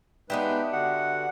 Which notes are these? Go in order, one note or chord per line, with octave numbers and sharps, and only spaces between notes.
G#3 B3 D4 D#4 G4 B4 E5
D3 F#4 F#5